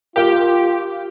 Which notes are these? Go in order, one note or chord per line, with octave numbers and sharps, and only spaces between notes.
F4 G4 A#4 F5